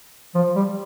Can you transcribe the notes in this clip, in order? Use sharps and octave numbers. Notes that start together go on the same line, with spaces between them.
F3
G3